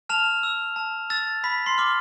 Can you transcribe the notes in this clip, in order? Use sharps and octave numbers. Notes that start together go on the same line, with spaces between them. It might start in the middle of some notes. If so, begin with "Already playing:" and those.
A5 F6 F7
E6
A5
E6 A6
B5 B6
C6 C7
D6 F6